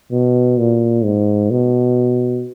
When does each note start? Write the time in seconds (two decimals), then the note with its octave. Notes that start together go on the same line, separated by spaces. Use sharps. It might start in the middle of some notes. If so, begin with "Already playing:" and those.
0.12 B2
0.58 A#2
1.04 G#2
1.51 B2